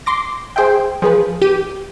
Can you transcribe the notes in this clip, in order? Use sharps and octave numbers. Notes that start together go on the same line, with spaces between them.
C6 D6 A#6
G#4 C5 E5 G5
F3 G#4 B4
G4 D#7